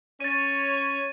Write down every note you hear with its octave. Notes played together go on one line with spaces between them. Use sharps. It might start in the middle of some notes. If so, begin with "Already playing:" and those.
C#4 C#5 A6 D#7